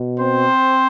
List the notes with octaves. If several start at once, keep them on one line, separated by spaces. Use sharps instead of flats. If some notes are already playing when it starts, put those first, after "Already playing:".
Already playing: B2
C4 C5